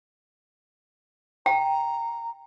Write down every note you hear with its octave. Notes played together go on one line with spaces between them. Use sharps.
G5 A#5